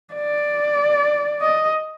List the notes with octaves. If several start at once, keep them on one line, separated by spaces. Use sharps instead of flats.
D5
D#5